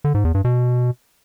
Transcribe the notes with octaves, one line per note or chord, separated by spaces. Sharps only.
D3
G#2
E2
G2
B2